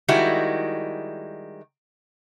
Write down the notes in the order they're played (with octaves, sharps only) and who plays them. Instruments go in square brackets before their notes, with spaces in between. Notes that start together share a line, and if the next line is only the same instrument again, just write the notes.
[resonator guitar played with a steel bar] D#3 G3 G#3 E4 F#4